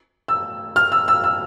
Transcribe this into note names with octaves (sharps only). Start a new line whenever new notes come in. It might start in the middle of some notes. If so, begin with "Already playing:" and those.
E6
F6
E6
E6
E6